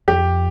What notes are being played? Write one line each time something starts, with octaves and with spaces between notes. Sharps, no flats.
F2 G4